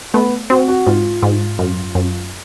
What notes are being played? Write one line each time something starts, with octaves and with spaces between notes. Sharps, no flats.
A3 B3
C4 F#4
F#4
G#2 F4
G#2
F#2
F#2